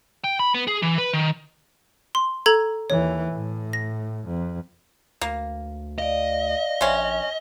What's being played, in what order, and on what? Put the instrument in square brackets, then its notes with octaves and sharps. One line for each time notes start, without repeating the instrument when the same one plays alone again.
[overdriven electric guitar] G5
B5
B3
G#4
E3
B4
D#3
[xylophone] C6
A4 A#5 G#6
[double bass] D#2 E3 [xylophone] C#5
[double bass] A2
[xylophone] A#6
[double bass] F2
[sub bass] D2 [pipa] A#3
[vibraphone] D5 F5 [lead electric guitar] D#5
[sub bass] A#1 [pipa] C3 C#4